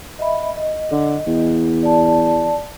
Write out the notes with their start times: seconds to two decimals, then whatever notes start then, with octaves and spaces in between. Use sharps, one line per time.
0.19 D#5 E5 B5
0.56 D#5
0.91 D3
1.27 E2
1.83 D5 A5